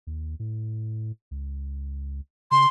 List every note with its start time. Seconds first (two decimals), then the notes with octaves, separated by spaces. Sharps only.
0.07 D#2
0.40 A2
1.31 C#2
2.51 C#3 C6